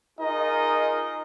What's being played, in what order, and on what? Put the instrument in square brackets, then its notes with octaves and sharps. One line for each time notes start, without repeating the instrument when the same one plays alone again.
[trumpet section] D#4 F4 G#4 A#4 D#5